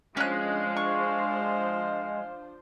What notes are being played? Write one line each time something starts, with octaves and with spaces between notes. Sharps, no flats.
F3 G#3 C#4 D4 C5 F5 F#6
C#6